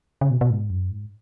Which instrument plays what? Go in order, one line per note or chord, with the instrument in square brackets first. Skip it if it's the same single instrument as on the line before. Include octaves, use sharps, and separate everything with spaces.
[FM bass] C#3
B2
B2
G#2
F#2
G#2